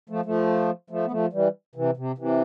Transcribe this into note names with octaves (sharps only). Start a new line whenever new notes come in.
F3 A3
F3 A3
F3 A3
B3
F3 A3
E3 G3
C3 E3
C3
C3 E3